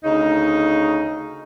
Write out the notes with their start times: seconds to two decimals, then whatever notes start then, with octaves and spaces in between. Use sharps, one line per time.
0.04 D2 C#3 D#4